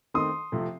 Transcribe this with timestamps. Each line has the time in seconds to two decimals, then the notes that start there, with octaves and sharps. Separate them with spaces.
0.14 D#3 A3 C4 C6 D#6
0.52 C3 F3 A3 C4